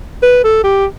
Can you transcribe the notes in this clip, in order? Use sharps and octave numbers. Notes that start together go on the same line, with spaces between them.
B4
A4
G4